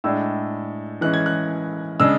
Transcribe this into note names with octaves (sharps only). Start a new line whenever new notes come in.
A2 G#3 D4 E6
E3 G#3 C#4 F#6
G#6
F#6
C#3 G#3 D4 E6